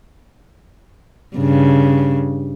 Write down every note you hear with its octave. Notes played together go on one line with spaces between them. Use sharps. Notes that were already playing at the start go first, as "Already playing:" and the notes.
G2 C#3